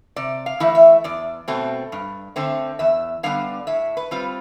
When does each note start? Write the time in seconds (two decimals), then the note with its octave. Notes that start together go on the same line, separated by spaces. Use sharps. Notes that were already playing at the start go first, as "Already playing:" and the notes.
0.16 C3 D5
0.46 F5
0.60 E3 A3 E4
0.75 E5
1.04 E2 D5
1.48 B2 A3 C4
1.92 G2
2.36 D3 A3 C4
2.79 E2 E5
3.23 D3 G3 B3 D4 F5
3.67 A2 E5
3.97 B4
4.11 G3 C4 F4